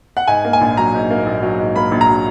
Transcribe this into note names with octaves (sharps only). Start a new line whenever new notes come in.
F#5
G#2 G#5
A#3
G#5
A#1
F#3 A#5
G#2
A#3
A#1
F#3
G#2
A#3 B5
A#1
A#5
F#3